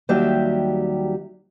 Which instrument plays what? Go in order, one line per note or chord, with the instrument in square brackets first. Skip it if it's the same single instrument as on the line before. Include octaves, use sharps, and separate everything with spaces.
[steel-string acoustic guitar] D#2 F#3 G3 G4 E5